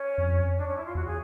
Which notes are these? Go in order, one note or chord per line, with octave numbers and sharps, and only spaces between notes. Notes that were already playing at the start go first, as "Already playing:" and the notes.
Already playing: C#4
F2
D4
C#4
E4
F4
E2 F#4
G#4